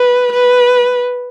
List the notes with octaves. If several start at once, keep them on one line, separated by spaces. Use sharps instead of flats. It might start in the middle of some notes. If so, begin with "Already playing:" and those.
Already playing: B4
B4